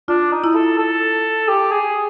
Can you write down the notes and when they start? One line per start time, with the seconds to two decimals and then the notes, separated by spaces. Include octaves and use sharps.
0.08 D4 F4
0.32 D#4
0.44 E4
0.55 A4
0.78 A4
1.48 G4
1.71 G#4